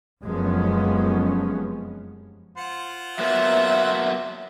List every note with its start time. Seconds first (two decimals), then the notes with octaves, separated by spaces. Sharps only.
0.24 F1 F#2 F3 G#3 B3 C#4
2.57 F4 C5 F#5
3.19 F#3 A#3 B3 E5